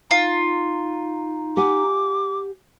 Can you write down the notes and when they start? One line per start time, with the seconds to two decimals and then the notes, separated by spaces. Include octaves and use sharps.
0.11 D#4 F4
1.57 G4 F#5 G#5 D6